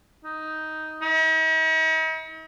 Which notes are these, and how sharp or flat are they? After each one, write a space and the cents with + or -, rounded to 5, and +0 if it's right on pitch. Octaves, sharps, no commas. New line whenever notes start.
D#4 +5
D#4 +45